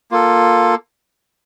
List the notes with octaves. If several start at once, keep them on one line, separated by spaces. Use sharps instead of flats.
A#3 F4 A4